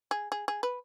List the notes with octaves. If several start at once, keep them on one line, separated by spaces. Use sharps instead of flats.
G#4
G#4
G#4
B4